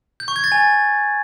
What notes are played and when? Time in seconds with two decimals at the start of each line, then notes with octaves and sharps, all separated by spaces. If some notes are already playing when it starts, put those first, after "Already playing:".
0.20 G6
0.28 C#6
0.36 G#6
0.44 A6
0.52 G#5